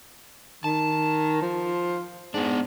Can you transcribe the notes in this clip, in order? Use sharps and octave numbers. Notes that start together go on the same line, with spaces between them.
D#3 A5
F3
G#2 B3 D4